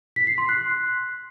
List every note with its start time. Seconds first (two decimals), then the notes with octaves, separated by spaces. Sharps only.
0.16 B6
0.27 C7
0.38 C6
0.49 F#6